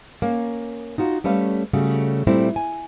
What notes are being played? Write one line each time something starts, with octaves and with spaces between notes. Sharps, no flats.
A#3 C#4
D#4 F4 F#4
G3 A3 C#4 B4 F5
C#3 G3 A3 F#4
A#2 G3 A3 C4 E4
G#5